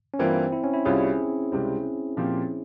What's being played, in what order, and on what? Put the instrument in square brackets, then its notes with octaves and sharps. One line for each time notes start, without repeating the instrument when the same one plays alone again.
[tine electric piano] C#4
[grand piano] G2 E3 A#3 F4 [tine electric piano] C4
[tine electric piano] E4
C#4
E4
[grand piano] C2 C3 G3 C#4 F4 [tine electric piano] G#4
[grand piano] C#2 C3 G3 C4
A#2 F3 C4 G4